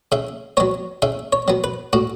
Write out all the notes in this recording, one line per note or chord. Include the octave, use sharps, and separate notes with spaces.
C#3 E5
F#3 B3 C#5
C#3 E5
C#5
F#3 B3
B4
A2 F#4